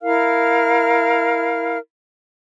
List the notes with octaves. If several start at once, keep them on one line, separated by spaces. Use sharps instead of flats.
E4 A#4 F5 F6